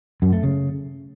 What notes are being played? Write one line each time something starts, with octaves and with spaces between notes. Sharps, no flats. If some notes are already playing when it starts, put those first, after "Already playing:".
F#2
A3
C#3